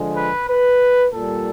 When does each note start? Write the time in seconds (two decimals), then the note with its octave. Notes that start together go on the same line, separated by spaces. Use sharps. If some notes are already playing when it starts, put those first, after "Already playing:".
Already playing: D3 F3 G#3
0.17 B4
0.49 B4
1.13 A#2 G3 A4